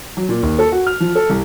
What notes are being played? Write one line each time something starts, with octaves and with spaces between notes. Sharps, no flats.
F#3
A#2
D#2
A4
F#4
F6
F3
A4
C2